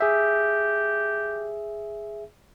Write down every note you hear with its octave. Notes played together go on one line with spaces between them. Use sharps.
G4 G#4 E5